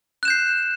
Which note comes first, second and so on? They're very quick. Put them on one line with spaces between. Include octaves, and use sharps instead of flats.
F#6 E7 G6 C7